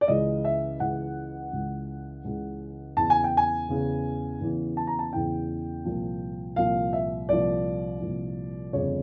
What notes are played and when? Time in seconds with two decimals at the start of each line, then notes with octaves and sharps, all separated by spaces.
0.01 D5
0.08 C#2 C#3 E3 D#5
0.45 E5
0.80 C#2 C#3 E3 F#5
1.53 C#2 C#3 E3
2.25 C#2 C#3 E3
2.97 E2 C#3 E3 A5
3.10 G#5
3.24 G5
3.37 G#5
3.68 E2 C#3 E3
4.41 E2 C#3 E3
4.77 A5
4.87 A#5
4.99 A5
5.13 E2 C#3 E3 G5
5.85 C2 A#2 F3
6.56 C2 A#2 F3 F5
6.93 E5
7.29 C2 A#2 F3 D5
8.01 C2 A#2 F3
8.73 G1 F2 C#3 C#5